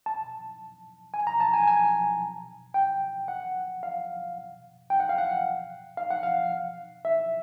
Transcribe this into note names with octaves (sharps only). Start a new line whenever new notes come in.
A5
G#5
A#5
A5
G#5
G#5
G5
F#5
F5
G5
F#5
F5
F#5
F5
F#5
F5
E5